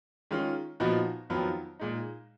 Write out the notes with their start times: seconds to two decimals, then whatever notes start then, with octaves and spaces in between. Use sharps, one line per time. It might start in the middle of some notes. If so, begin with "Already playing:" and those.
0.31 D#3 G#3 C#4 F4
0.80 A#2 F3 B3 D#4 F#4
1.30 F2 D#3 F#3 B3 F4
1.80 A#2 G#3 D#4